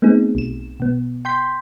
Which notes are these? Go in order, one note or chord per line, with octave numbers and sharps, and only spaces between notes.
A3 B3 C4 D#4 G#4
B1 E7
B2 B3
G5 C6 G6 B6